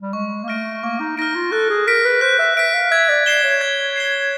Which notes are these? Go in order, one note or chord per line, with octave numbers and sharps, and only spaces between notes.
G3
G#3 C#6
A#3
A3 F6 A#6 D7
A#3 C#6
D#4
D#4 F6 A#6 D7
F4
A4 F#6
G#4
A#4 B6 D7
B4
C5 F#6
E5
E5 B6 D7
F5
E5 G#6
D5
D5 C7 E7 G7
C#5
G#6
C7 E7 G7